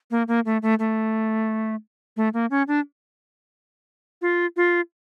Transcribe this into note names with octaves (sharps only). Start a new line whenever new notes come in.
A#3
A#3
A3
A3
A3
A3
A#3
C#4
D4
F4
F4